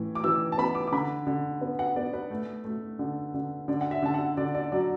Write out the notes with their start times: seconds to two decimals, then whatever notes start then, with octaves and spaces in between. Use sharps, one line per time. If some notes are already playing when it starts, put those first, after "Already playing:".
Already playing: A2 E3
0.15 D6
0.24 E3 E6
0.52 A5
0.58 B3 B5
0.75 D6
0.87 D6
0.92 D3 B5
1.27 D3
1.61 B3
1.79 F#5
1.96 B3 D5
2.13 B4
2.31 A3
2.65 A3
2.99 D3
3.34 D3
3.68 D3 D5
3.81 F#5
3.91 E5
4.02 D3 A5
4.14 F#5
4.37 D3 D5
4.55 D5
4.72 F#3 D5